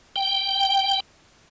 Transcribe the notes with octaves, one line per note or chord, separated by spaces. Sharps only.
G5